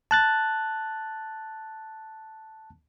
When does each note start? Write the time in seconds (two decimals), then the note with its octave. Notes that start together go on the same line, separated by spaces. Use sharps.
0.11 A5 F#6 A6